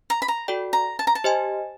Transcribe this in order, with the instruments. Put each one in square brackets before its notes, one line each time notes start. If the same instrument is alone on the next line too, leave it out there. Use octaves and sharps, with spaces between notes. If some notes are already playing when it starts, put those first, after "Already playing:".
[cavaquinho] A#5
B5
A#5
[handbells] F#4 A4 D5 G5
[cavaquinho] A#5
A5
A#5
A5
[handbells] G4 C5 D#5 G#5